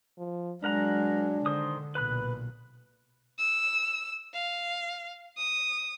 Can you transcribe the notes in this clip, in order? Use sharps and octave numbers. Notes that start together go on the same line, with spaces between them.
F3
F#3 G#3 D4 A#4 F#5 A#5
D3 D#3 C5 D#6
B1 A#2 B4 B5 F#6
E6
F5
D#6